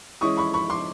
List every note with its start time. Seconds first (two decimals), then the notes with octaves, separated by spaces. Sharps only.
0.21 E3 G#3 C#4 E4 C#6 D#6
0.37 B5 C#6
0.54 B5 C#6
0.70 C6 D6